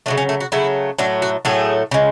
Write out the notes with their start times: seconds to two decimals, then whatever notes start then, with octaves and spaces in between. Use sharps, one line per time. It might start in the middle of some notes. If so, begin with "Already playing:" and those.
0.06 C#3 F#3 A3 D4
0.17 C#4
0.29 A3
0.40 F#4
0.52 C#3 F#3 A3 E4
0.99 A2 F#3 A3 D4
1.22 F#4
1.45 A2 F#3 A3 G#4
1.91 C#3 G#3